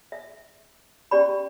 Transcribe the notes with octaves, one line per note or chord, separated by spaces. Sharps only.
E5
C#4 G4 D5 B5